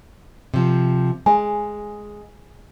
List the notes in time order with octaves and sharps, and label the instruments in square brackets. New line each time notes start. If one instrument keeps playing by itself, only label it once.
[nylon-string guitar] C3 F3
[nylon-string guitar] G#3 [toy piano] G#5